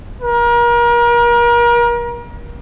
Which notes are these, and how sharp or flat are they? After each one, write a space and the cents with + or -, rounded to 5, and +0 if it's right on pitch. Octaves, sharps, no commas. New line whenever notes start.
A#4 +35